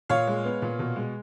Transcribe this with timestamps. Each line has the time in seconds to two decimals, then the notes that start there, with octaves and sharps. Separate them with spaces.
0.10 A#2 C#5 F5
0.27 G#3
0.44 B3
0.62 A#2
0.79 B2
0.96 G#3